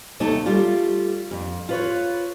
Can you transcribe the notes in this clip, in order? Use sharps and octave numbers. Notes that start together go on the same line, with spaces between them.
D#2 C3 A3 D#4 C#5 A5
G3 A3 F4
F2
F4 B4 C#5